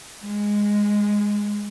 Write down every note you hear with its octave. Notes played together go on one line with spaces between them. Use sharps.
G#3